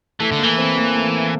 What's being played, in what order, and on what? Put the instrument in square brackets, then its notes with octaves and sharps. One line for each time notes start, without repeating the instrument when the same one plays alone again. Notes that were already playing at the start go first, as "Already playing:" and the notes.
[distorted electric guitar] E3 [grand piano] A3
[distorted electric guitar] D3
[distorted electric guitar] E3 [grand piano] A#3
[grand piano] C4
A#3
A3